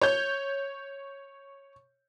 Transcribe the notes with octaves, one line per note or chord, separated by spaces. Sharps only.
C#5 G6